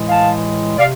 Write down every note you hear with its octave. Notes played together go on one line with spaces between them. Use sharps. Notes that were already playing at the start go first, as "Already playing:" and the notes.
Already playing: A2 E3 G#3
F5 A5
C3 D5 F5